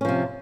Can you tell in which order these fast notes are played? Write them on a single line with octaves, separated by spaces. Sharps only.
C#4 F3 C3